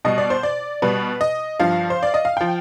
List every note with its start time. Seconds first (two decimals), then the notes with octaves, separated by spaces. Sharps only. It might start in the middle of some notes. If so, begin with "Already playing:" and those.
0.05 B2 G3 D#5
0.18 D5
0.30 C5
0.43 D5
0.82 B2 G3 B4
1.21 D#5
1.60 G2 F3 F5
1.90 C5
2.03 D5
2.14 D#5
2.25 F5
2.37 F3 G5